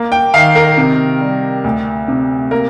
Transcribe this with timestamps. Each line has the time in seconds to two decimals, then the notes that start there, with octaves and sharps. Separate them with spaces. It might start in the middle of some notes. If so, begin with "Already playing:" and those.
Already playing: A#3
0.12 G5
0.34 D#3 F5
0.55 A#4
0.77 C3
1.20 G3
1.64 D2
2.08 C3
2.51 A#3 A#4